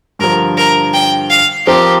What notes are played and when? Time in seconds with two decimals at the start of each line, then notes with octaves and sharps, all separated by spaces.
0.19 G2 D3 F3 A#4
0.57 A#4
0.93 G5
1.30 F5
1.67 F3 C4 G4 A#4